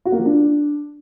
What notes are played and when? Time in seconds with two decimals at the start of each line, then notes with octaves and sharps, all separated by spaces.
0.05 F#4
0.12 A#3
0.19 F3
0.26 D4